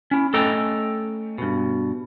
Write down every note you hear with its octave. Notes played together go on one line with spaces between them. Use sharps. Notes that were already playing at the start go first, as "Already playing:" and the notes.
C#4 E4
A3 C#4 A4 D#5 G5 A#5
G2 B2